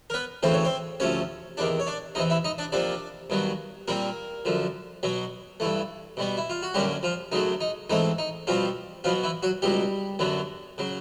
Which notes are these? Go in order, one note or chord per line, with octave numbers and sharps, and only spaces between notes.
A#4
B3 B4
D2 C#3 E3 A3 C4 C5
C#5
C4 C5
D2 C3 F3 A3 C#4 C#5
E2 C3 D#3 D4 D5
C#5
D4 D5
E2 C3 E3 D#4 D#5
E4 E5
D#4 D#5
D4 D5
C3 F3 A#3 D4 D5
G2 D#3 F#3 B3
A#2 G3 A#3 C4 A#4
F#2 D3 F3
B2 F#3 B3
G2 E3 A3
B2 G3 B3
E4
F4
F#4
F#2 D3 F#3 G3 A#3 C#4 G4
F3 F4
F#2 C#3 F#3 A3 D#4
D#4
G#2 E3 A3 C4 D#4
D#4
B2 F3 G3 C4 F4
B2 F3 F#3 B3 F4
E3 E4
F#3 F#4
C#2 B2 F#3 G3 G4
F#2 D3 F#3 B3
C#3 F#3